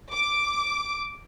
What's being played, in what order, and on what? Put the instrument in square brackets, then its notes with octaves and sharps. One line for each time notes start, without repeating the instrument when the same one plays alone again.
[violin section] D6